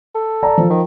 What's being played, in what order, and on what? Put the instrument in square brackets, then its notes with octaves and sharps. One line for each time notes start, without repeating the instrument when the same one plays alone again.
[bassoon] A4
[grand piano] D5 A5 A#5
F3
[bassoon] D#3